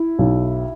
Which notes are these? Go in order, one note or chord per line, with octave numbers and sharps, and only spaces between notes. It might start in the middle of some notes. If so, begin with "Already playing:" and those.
Already playing: E4
B1